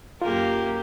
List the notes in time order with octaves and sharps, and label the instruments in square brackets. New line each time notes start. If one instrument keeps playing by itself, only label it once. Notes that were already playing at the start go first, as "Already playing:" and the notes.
[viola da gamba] F#2 A#3 A#4 [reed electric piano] F4 [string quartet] G4